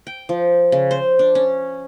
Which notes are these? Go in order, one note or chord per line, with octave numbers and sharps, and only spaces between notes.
G5
F3
C#3
C5
D4
C#4